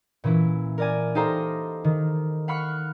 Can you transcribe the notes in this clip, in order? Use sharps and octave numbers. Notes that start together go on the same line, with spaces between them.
A#2 E3 C#4 E4
A#4 D5 G#5
D#4 G4 A4 C5 F5 A#5
D#3
F5 F#5 B5 C#6 F6 C#7